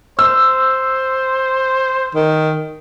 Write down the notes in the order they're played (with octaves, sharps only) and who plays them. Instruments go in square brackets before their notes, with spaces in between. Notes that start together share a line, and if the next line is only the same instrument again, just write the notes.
[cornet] C5 [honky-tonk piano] E6
[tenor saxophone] D#3